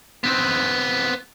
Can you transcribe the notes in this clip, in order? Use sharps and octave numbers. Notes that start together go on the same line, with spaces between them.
B3 C4